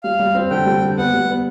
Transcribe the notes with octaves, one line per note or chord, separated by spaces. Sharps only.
G3 F5
G3
C4
D3 G5
G3
D3
B3 F#5
G3
B3